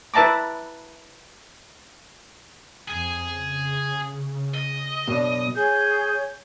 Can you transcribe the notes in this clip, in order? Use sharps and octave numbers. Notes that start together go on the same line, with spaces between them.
E4 B4 E5 A5 A#5 D6
F2 G#4
C#3
D#5
F#2 B2 D4
G#4 C#5 G#5 G6